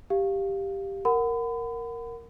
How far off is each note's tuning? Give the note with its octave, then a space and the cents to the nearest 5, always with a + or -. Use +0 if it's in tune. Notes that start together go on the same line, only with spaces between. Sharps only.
G4 +0 F5 +0
A#4 -5 F#5 +0 B5 +35